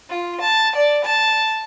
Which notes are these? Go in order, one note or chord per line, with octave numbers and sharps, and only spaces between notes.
F4
A5
D5
A5